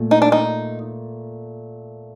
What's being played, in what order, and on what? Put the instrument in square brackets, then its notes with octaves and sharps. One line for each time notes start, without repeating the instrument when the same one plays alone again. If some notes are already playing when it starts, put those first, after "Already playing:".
Already playing: [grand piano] A#2 A3
[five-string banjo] D#4
D4
D#4